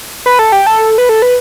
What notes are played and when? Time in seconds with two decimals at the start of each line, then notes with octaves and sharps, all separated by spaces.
0.26 B4
0.39 A4
0.52 G4
0.66 A4
0.98 B4
1.09 A4
1.22 B4